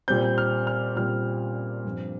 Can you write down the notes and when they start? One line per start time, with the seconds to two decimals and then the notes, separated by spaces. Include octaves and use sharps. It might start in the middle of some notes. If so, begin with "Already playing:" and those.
0.08 A#2 G3 C4 G6
0.38 F6
0.67 F6
0.96 A#2 G3 C4 F6
1.85 G2 F3 C4